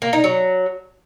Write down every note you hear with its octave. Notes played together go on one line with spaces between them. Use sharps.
A#3
D#4
F#3